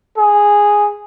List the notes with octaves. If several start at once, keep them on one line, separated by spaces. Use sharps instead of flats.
G#4